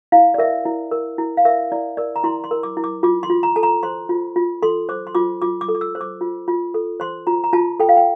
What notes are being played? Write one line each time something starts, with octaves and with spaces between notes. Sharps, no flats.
E4 F5
D5
A#4 E5
E4
A#4
E4
F5
A#4 E5
E4 D5
A#4 D5
A#5
E4 C6
C6
A#4
D6
E4
D6
F4 D6
C6
F4
A#5
A4 A5
A#5
C5 C6
F4
F4
A4 C6
C5 D6
C6
F4 D6
F4 D6
D6
A4
D6
E6
C5
D6
F4
F4
A4
C5 C6
F4 A#5
A#5
F4 A5
A4 G5
F5
G5